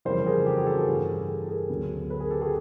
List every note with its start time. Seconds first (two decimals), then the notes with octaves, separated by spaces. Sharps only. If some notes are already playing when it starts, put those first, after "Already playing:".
0.05 F2 C#3 E3 G3 A#4 C5
0.26 G#4 A#4
0.46 G4 A4
0.56 F#4 G#4
0.66 G4 A4
0.76 G#4 A#4
0.87 G2 E3 A3
1.28 G4 A4
1.48 G#4 A#4
1.70 D2 D3 F#3 B3
2.10 A4 B4
2.20 G#4 A#4
2.31 G4 A4
2.41 F#4 G#4